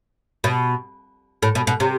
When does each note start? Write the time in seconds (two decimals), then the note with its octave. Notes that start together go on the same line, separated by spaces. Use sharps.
0.44 B2
1.43 A2
1.55 B2
1.67 B2
1.80 C3